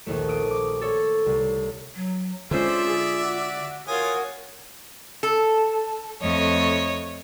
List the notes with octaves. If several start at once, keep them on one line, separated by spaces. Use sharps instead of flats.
A#1 D#2 A3
D#6 D7
D6
A4 C#5
C2
F#3
D3 G#3 C#4 F4 C5 D5 E5
G#4
F#4
F4 F#4 A#4 C#5 G#5 D#6
A4
F2 A3 C#5 D#5